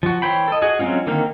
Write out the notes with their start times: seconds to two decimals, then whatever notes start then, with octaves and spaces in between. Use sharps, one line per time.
0.03 F3 F#4
0.22 E3 C5 C#5 G5 B5
0.48 A4 D#5
0.62 F#4 G#4 D#5
0.79 F#3 G#3 C4 C#4 F4
1.07 D3 D#3 A#3 C4 F5